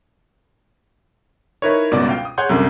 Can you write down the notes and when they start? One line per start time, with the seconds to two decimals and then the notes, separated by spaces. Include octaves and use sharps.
1.62 D#4 E4 A#4 B4 C#5
1.91 G1 C#2 B2 D5
2.09 F5 G5
2.25 D#6
2.38 G#4 C#5 F#5 C6 C#6 G6
2.49 C2 F#2 D3